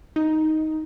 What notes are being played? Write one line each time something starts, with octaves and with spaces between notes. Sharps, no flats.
D#4